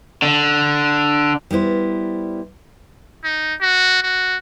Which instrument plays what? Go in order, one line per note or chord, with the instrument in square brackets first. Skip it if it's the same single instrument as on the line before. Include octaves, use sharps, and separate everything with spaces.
[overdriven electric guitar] D3
[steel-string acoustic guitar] G3 B3 E4 C5
[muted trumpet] D#4
F#4
F#4